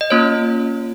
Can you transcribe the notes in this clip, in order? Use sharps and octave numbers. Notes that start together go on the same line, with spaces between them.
D#5
A#3 C#4 F4 C#5